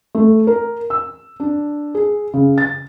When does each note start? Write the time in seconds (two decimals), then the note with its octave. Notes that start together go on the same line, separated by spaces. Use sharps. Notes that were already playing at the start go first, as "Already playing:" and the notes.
0.15 A3
0.47 A#4
0.90 E6
1.40 D4
1.95 G#4
2.34 C#3
2.58 A6